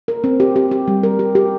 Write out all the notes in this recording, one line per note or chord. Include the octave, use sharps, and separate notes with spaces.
A#4
C4
G4
G4
G4
G3
A#4
G4
G4